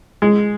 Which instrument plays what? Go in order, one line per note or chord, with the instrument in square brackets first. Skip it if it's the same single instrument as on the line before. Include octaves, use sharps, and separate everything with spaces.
[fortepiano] G#3